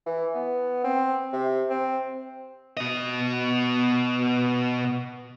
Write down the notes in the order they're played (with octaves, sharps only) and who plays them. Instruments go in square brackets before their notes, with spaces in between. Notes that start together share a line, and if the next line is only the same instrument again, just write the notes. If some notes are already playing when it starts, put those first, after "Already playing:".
[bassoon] E3
B3
C4
C3
C4
[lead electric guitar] B2 D#5